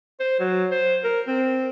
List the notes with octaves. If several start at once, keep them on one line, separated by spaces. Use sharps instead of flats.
C5
F#3
C5
A#4
C4